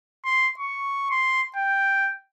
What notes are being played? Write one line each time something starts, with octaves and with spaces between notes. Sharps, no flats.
C6
C#6
C6
G5